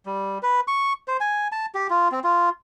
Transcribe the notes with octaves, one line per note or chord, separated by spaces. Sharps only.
G3
B4
C#6
C5
G#5
A5
G4
F4
C4
F4